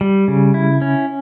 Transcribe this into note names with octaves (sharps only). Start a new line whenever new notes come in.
G3
C#3
E4
C#4